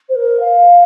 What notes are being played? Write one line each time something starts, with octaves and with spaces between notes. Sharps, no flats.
C5
A#4
F5